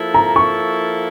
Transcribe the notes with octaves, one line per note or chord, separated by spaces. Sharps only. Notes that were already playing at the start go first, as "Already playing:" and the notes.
Already playing: F3 A#3 E4 A4
A#5
C#6